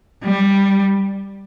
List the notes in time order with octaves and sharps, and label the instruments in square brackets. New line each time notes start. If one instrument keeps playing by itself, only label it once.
[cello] G3